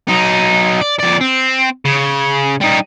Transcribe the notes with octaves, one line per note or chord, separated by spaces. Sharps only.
F#3 D#4
D5
F2 D5
C4
C#3
G3 D#4